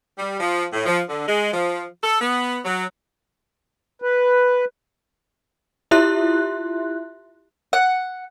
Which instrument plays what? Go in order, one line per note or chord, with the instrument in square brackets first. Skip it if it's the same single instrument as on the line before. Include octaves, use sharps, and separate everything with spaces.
[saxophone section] G3
F3
A2
F3
D3
G#3
F3
A4
B3
F#3
[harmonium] B4
[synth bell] E4 F4 G4 E5 C6 F#6
[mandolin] F#5